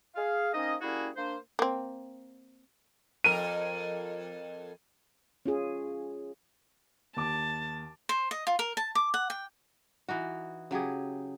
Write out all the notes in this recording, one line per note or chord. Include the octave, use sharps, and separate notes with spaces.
G#4 F5
A#3 C4 C#4 D#4 D#5
G3 A#3 C#4 E4 F#4 G#4
A#3 D4 C5
A#3 C4
F2 A#4 D#7
C#4 F4 G#4
D#2 A5 D6
C5
D#5
F4
A#4
A5
D6
F#5
G5
E3 D#4 F#4
C#3 F#3 G4 G#4